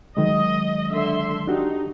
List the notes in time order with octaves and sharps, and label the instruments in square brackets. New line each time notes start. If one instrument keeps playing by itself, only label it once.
[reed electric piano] D#3 F#3 G#3 [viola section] D#5
[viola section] D3 E5 C6
[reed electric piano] D4 F#4 G4 [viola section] D#4